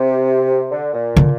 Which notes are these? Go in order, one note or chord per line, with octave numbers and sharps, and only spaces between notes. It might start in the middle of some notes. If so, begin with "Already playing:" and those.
Already playing: C3
D3
A#2
D3